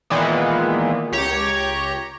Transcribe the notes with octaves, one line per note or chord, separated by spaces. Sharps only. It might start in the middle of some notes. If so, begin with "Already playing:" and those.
A#2 D#3 E3 G#3 A#3 B3
C#2 G4 C#5 A#5